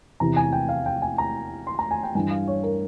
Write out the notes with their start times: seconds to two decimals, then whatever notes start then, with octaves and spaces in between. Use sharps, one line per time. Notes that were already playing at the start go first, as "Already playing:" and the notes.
0.20 E2 C3 E3 A#5
0.36 G#5
0.52 G5
0.69 F5
0.86 G5
1.02 G#5
1.18 A#5
1.67 C6
1.79 A#5
1.91 G#5
2.03 G5
2.15 G2 E3 G#5
2.31 F5
2.47 C#5
2.63 A#4